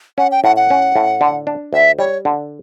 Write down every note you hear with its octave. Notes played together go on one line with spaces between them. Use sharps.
C#4 F#5
G5
A2 F#5
F#5
C#4
A2
D3
D4
D2 E5
G3 C#5
D3